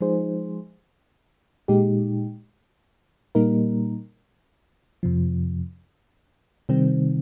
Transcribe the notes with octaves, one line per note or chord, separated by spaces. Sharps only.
F3 G#3 D#4 G#4 C5
A#2 G#3 D#4 G4
A#2 G3 A#3 D#4 A#4
F2 C3 F3
C3 D#3 G3 C4